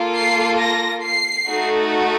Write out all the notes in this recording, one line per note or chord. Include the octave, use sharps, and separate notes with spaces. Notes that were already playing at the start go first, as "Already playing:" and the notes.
Already playing: A#3 F4 A4
C7
A#6
C7
A3 D#4 F#4 A4